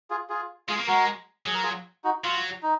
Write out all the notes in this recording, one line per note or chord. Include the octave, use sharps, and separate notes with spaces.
F4 G#4
F4 G#4
G#3 F4 G#4
A#3
G#3 F#4 A#4
F#3 G#4
A#4
F4 G#4
D#4 F#4
F#3 F4
D#4